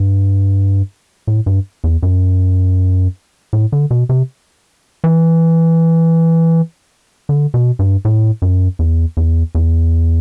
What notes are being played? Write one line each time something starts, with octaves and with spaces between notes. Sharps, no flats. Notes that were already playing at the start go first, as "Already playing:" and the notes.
Already playing: G2
A2
G2
E2
F#2
A2
D3
B2
C3
E3
D3
B2
G2
A2
F#2
E2
E2
E2